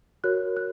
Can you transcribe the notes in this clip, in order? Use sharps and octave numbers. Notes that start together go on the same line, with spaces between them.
F#4 A#4 C#5 F#6
F#6